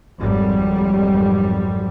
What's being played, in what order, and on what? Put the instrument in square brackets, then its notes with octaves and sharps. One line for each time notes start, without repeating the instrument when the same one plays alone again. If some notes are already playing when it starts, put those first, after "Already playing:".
[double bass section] G#1 F2 F#3 G3